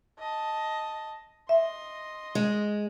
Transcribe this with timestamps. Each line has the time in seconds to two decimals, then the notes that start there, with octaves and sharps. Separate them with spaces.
0.19 D#5 A5
1.49 D#5 E5 C6
2.35 G#3